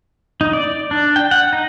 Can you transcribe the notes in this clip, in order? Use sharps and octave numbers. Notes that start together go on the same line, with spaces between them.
D#4
D5
D4
G5
F#5
D#4